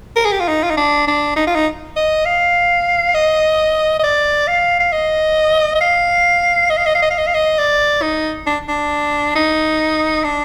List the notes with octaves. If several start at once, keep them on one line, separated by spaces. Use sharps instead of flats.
A#4
G#4
G4
F4
D#4
F4
D#4
D4
D4
D#4
F4
D#4
D#5
F5
D#5
D#5
D5
F5
F5
D#5
D#5
F5
D#5
F5
D#5
F5
D#5
F5
D#5
F5
D#5
D5
D#4
D4
D4
D#4
D4